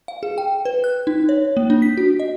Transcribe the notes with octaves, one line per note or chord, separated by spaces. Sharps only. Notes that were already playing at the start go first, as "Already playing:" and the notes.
F5
G#4
G5
B4
F#6
D#4
C#5
A#3
D4
B6
F#4
D#5